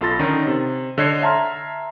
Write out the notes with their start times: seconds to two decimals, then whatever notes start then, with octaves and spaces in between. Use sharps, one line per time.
0.01 B1 F4 A4 B5 A6 A#6
0.19 D3 D#3 C#4 D#4
0.47 C3
0.98 D3 C#5 D#5 F#6 G#6 C7
1.22 E5 A5 A#5 C6 F6